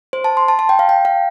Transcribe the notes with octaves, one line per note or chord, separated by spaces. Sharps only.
C5
A5
C6
A5
A5
G5
F5
G5
F5